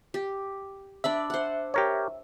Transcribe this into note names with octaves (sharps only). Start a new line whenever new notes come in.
G4
D4 D5 E5 B5
C5 F#5
G4 A#4 C#5